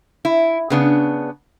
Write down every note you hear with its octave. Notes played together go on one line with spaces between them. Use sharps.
E4
C#3 B3 D4